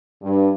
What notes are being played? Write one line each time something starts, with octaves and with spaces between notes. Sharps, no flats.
G2